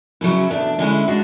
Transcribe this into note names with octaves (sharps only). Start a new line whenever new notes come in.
E2 C#3 F#3 C#4 E4
E2 B2 A3 D4
D3 G#3 C#4 E4
G#3 D4 F#4